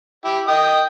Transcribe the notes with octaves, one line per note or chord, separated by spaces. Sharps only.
E4 G4
D#5 G5 D#6